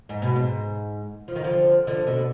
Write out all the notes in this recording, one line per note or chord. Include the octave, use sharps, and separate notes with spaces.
G#2
B2
G#2
F3
D#3
D3 F3
D3 F3
B2 D3